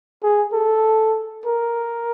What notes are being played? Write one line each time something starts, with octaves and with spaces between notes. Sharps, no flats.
G#4
A4
A#4